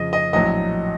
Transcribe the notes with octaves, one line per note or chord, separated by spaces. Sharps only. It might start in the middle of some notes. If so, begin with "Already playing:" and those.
Already playing: F2 C#3 F3 D#5
D#5
A#1 A2 F#3 D#5